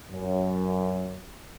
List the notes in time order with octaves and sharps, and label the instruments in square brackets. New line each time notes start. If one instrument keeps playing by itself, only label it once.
[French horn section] F#2